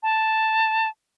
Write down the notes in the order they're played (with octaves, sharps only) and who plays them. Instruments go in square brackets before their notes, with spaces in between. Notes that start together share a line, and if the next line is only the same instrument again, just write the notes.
[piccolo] A5